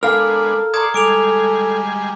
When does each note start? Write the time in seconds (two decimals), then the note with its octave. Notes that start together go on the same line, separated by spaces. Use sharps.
0.03 G#3 B3 D4 A4 A#4 F5 F6
0.74 D5 A#5 C6 C#6 D#6 G#6
0.94 G3 G#3 G#4 A4 D6 D7 F7